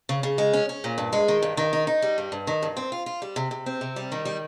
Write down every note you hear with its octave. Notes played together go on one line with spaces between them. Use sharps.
C#3
C#3
G#3
C#4
C#4
A#2
G2
G#3
D#3
G2
D#3
D#4
D#4
G3
G2
G2
D#3
G2
C4
F4
F4
G3
C3
C3
C4
C3
G3
D#3
G3